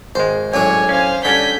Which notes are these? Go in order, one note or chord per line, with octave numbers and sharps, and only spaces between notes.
G#1 G#3 C5
F#2 A2 D4 C#5 G#5
C#4 C5 F5
D3 G3 C#4 D4 G#5 G6 B6